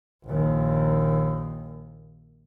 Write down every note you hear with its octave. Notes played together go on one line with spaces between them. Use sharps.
A#1 D#2